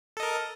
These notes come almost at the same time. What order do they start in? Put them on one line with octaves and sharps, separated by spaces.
A4 D#5 A#4